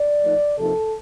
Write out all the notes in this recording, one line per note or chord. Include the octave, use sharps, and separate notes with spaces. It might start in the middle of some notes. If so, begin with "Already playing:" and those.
Already playing: D5
F3 A3 D#4
C3 F3 A#3 D#4 A4